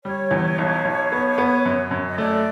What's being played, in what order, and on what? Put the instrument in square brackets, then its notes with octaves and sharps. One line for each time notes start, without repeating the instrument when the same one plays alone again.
[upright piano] G3 [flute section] C#5
[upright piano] E2
B1
B1
B3
B3
F#2
F#2
[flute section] D#5
[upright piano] A3 [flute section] D5